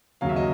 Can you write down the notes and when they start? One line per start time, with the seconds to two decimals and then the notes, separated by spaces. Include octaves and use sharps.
0.21 D#2 C#3 F#3 F5
0.29 E5
0.36 D#5